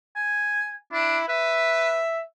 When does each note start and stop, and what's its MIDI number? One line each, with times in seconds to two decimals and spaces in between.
0.16 0.72 80
0.92 1.18 62
0.92 1.28 64
1.29 1.99 71
1.29 2.23 76